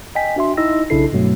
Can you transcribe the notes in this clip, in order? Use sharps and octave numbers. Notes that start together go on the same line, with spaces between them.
D#5 G5 G#5 B6
D4 F#4 E5 C6
D#4 E4 D#5 E6 A#6
B1 C#3 D4 E4 A4 C7
G2 B2 F#3 A3